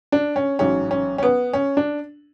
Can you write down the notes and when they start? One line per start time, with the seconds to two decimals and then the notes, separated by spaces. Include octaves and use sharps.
0.12 D4
0.36 C#4
0.59 A1 G#2 F#3 C#4
0.91 C#4
1.18 C#4
1.23 B3
1.53 C#4
1.77 D4